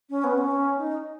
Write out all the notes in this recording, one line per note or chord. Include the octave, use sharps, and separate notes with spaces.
C#4
B3
C#4
D#4